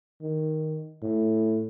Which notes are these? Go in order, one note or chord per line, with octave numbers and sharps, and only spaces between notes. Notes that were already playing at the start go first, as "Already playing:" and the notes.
D#3
A2